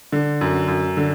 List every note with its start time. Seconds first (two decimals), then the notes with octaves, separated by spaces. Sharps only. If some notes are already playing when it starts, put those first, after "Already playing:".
0.12 D3
0.41 F#2
0.68 F#2
0.97 D3